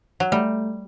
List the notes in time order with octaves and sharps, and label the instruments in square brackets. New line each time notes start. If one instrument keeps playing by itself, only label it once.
[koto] F#3
[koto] G3 [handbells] A3